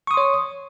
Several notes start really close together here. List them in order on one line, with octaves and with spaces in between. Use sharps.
C#6 D#6 C6 C#5